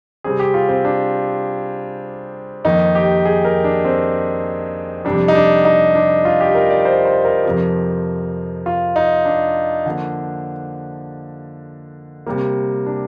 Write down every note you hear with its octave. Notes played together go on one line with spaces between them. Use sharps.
C3 G3 C4 G#4
G4
F4
C4
D4
F2 D#3 A#3 D#4
G4
G#4
A#4
D4
C4
F2 C3 G3 D4
D#4
D4
D#4
D4
F4
G4
A#4
D5
C5
C5
A#4
F2 C3 F3
F4
D#4
D4
D3 F3 A#3
C3 G3 A#3
D4